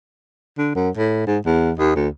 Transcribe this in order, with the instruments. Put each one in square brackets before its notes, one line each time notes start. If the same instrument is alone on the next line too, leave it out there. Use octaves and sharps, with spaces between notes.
[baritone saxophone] D3
F#2
A2
G#2
E2
D#2
D2